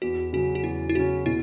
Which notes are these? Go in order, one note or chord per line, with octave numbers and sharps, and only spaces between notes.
E2 F#4
C#3 F#3 C#4 F#4
F#4
E2 E4
E4
C#3 F#3 C#4 F#4
B2 E4